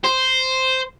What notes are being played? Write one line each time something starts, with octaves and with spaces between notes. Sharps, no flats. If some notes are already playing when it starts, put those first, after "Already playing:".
C5